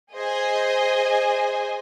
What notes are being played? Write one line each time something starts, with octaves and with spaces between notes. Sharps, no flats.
G#4 C5 D#5 G#5